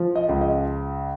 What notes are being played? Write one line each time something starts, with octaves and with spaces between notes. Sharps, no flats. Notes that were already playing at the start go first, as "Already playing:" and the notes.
Already playing: F3
D#5
C#2
D#5